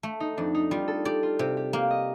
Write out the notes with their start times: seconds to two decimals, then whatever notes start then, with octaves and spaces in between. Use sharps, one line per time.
0.03 A3
0.20 D#4
0.37 F2 D4
0.55 D#4
0.71 G3 F4
0.88 A4
1.05 G4 D5
1.23 F4
1.39 C3 G4
1.57 G4
1.73 A#3 G4
1.91 D#5